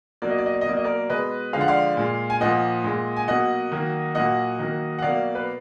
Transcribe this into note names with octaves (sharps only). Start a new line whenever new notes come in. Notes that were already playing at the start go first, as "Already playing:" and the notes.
B2 F#3 A#3 D5
D#5
D5
D#5
D5
D#5
B2 F#3 A#3 D5
D#5
A#4 D5
B2 G#3 B4 D#5
D3 F3 G#3 F5
F#5
D5 F5
A#2 G#3
G#5
A#2 F3 A#3 D#5 F#5
A#2 G#3
G#5
B2 F#3 A#3 D#5 F#5
D#3 F#3 A#3
A#2 F#3 A#3 D#5 F#5
D#3 F#3 A#3
F#5
B2 F#3 A#3 D5 F5
B4